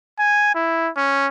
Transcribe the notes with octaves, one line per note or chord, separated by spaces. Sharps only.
G#5
E4
C#4